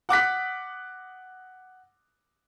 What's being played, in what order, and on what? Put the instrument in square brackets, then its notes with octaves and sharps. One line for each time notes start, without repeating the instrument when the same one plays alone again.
[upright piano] F#5 D6 F#6 B6